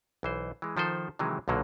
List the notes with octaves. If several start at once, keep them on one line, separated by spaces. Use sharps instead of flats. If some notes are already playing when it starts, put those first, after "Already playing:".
B1 E3 C5
E3 G#3
D#3 F3 A4 C5
C3 D#3 E3 F#3 G#3
B1 A#2 D3 F#3 A#3